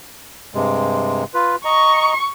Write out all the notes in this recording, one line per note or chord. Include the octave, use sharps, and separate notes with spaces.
G2 C3 G#3
F4 B4
D#5 A#5 C#6